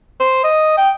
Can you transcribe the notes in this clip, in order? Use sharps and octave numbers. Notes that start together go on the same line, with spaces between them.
C5
D#5
G5